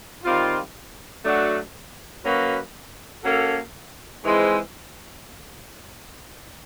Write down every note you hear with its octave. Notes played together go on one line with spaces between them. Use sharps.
D#3 G3 C4 F4
F#3 A3 D4 F#4
F#3 A#3 C#4 F#4 B4
A#3 C#4 F#4 A4
G#2 E3 G#3 C4 E4